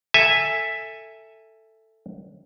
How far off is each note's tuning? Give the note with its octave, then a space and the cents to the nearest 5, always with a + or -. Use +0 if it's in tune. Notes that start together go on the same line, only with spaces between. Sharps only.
A4 +10 E5 +0 G#5 -10